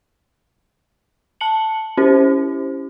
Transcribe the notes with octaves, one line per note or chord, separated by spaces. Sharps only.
A5 C#7 F#7
C#4 E4 G4 C5